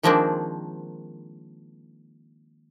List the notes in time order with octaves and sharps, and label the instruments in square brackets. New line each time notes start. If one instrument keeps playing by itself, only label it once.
[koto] D#3 F3 G#3 A#3 C4 D4